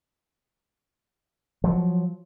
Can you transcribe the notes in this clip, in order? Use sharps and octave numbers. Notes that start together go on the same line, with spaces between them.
F3 F#3